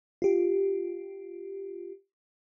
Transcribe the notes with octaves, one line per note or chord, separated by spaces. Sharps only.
F4 G4